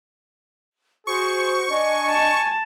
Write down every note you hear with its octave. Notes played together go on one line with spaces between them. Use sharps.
F#4 G#4 C5 C#6
D4 D#5 G#5
A5